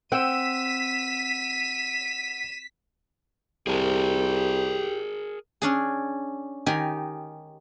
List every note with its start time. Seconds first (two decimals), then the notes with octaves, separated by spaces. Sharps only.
0.12 C4 F#5 G5 E6 B6 D#7 E7
3.67 C2 G4 G#4 A#4
5.62 C#4 D4 G#4
6.66 D#3 D#4 G4 G#5